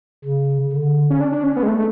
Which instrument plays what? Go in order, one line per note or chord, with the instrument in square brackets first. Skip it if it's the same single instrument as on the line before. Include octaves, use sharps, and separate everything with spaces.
[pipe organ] C#3
D3
[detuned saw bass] C#4
D4
D4
C#4
B3
G#3
A3